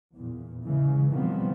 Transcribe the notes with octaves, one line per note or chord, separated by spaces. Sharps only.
E2 A#2
C#3 E3 G#3
B2 D#3 F3 G3 B3 C4